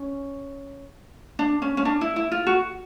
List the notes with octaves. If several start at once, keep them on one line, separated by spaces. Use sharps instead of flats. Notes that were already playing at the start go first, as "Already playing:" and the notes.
Already playing: C#4
D4
C#4
C#4
D4
E4
E4
F4
F#4